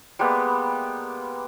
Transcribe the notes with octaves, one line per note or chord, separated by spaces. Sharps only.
G3 G#3 A#3 B3